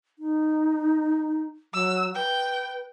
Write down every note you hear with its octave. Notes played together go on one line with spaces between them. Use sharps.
D#4
F#3 E6
B4 G5